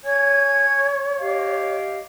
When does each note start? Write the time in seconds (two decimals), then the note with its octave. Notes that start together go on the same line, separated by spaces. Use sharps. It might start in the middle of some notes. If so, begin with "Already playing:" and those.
0.04 C#5 G#5 G#6
1.20 G4 D#5 F5